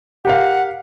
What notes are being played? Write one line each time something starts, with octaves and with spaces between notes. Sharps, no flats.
G4 A#4 F5 F#5